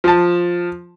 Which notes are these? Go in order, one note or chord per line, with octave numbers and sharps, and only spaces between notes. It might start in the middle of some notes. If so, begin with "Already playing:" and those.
F3 A5